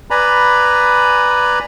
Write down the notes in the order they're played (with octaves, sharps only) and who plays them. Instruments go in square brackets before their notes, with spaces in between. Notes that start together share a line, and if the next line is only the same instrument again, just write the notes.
[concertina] B4 D5 G#5 A#5 B5